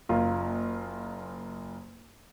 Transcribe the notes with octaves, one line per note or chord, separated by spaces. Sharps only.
F#1 A#3 F4